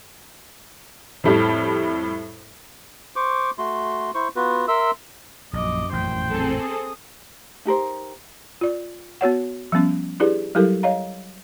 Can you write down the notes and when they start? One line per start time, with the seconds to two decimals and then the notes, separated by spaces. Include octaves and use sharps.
1.24 F2 A2 G3
3.16 C5 C#6 D6
3.58 A3 F#4 C6
4.15 E4 C5 C#6
4.36 B3 F4 F#4 B4
4.68 A#4 E5 C6 E6
5.53 A#1 F#2 D#5 D6
5.93 A1 F2 A#2 C5 G5
6.31 C4 G#4 A4
6.63 D#6
7.65 D#4 G4 A#4 C5
8.61 F4 D5
9.21 B3 F#4 C#5 F#5
9.72 F3 G3 B3 C#4
10.20 D4 E4 G4 G#4 B4 D5
10.55 F#3 G3 E4 G4 A4 A#4
10.83 C#5 D#5 F5 A#5